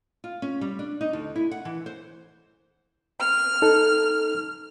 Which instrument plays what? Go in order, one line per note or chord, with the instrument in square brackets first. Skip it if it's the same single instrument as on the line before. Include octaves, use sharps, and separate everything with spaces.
[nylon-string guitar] F4
C#4
G3
D4
D#4
D2
E4
F#5
E3
C5
[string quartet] F6
[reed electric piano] D#4 A4